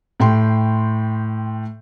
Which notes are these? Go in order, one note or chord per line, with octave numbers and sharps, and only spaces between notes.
A2 G5 C6